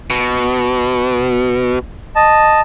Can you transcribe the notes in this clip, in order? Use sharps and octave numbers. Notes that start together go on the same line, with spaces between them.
B2
D#5 A5